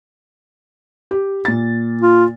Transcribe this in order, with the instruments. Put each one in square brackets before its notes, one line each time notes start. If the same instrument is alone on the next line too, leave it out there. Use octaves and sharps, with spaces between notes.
[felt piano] G4
A#2 A6
[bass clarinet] F4